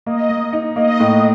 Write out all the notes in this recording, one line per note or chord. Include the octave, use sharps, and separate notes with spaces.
A#3 D#5
A#3
D#4
A#3 D#5
A2